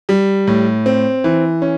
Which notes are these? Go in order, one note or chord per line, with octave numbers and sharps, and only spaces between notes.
G3
A2
C4
E3
C#4